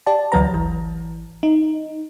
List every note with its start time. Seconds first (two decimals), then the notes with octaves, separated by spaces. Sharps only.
0.06 G4 D5 A5
0.32 D2 E3 F#3 F#4 B4 A#5
0.53 G#1 E3
1.43 D#4